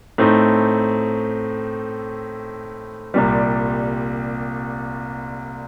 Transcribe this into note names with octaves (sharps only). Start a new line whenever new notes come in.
A2 A3 C4 D#4
C2 A#2 G3